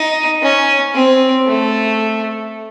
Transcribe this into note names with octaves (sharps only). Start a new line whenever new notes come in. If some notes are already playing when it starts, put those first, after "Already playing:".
Already playing: D#4
C#4
C4
A3